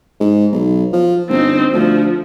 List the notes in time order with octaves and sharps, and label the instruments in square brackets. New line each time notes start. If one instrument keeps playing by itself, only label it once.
[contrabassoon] G#2
B1
F3
[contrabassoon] G1 [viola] C4 D#4
[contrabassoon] D2 [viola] F3